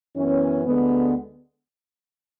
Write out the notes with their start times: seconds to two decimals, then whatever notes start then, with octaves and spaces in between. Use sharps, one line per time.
0.15 F#2 E3 B3 C#4
0.65 D2 D3 G#3 B3